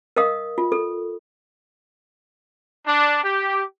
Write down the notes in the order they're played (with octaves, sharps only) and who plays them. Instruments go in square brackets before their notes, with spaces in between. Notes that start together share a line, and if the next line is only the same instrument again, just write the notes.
[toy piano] A#4 D#5 F5 D#6
F4
A4
[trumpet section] D4
G4